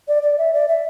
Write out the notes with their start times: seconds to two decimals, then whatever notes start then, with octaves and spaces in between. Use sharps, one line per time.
0.08 D5
0.23 D5
0.38 E5
0.53 D5
0.68 E5